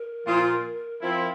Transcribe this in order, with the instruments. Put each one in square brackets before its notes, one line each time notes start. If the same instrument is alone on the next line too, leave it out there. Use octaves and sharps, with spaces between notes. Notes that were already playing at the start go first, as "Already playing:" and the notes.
Already playing: [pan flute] A#4
[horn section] A#2 F3 A#3 F4
F3 C4 E4